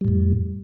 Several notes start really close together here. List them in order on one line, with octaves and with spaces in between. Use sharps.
G3 A2 F2